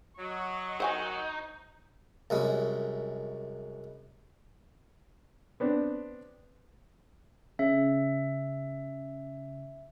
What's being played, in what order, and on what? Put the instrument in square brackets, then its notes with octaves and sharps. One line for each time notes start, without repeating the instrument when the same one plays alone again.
[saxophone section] F#3 [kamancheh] D#5 C#6
[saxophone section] D#3 F#3 [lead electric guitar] D#4 [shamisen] C5 F#5 G#5
[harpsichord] C2 F#2 G#3
[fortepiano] B3 C4 D4
[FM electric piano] C#3 [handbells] E5